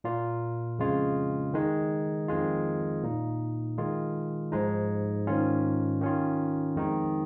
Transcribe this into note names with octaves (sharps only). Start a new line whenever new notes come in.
A#2 A#3 F4
F2 C#3 G#3 F4
D#3 G#3 D#4
F2 D#3 G#3 F4
A#2 A#3 D#4
D#3 G#3 F4
G#2 F3 G#3 D#4
G#2 D#3 C#4 F4
D#3 C#4 F4
F2 D#3 G#3 D#4